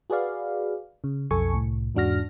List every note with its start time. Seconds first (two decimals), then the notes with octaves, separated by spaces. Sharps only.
0.10 F#4 G#4 B4 D5 F5
1.04 C#3
1.31 B1 F2 A4 G#5 C#6 C#7
1.54 C2 A2
1.95 E2 G#2 D4 F#4 F6 A#6